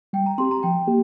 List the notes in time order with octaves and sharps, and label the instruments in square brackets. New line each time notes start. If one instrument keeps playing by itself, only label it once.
[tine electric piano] G3 [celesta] G5
[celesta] A#5
[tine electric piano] C4 G4 [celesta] C6
[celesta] A#5
[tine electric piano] F3 [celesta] G5
[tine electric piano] A#3 G4